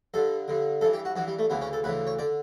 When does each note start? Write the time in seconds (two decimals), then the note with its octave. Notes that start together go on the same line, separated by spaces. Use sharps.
0.14 G2 D3 A4
0.48 G2 D3
0.81 G2 E3 A4
0.93 G4
1.05 F#4
1.16 G2 E3 F#4
1.28 G3
1.39 A3
1.50 D2 C#3 E3 B3
1.61 C#4
1.73 A4
1.84 D2 C#3 E3 B4
2.07 C#5
2.19 D3 D5